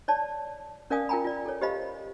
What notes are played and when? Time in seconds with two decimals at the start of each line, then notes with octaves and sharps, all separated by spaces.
0.08 C#5 D5 A5
0.90 C#4 A#4 D5 F5 G#5 D#6
1.09 F4 A#4 G5 G#5 A#5 B5
1.24 F4 D5
1.46 A4 C#5
1.61 G4 C5 D#5 F5 B5